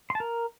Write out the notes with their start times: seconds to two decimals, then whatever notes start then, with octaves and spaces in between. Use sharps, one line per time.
0.10 C6
0.15 A5
0.20 A#4